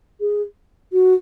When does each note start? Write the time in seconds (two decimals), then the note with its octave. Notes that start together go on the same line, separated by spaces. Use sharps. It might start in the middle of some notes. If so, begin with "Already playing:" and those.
0.21 G#4
0.93 F#4